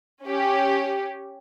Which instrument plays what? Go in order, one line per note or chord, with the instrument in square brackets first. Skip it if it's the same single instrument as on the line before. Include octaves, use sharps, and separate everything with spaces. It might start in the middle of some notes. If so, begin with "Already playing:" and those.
[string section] C#4 G4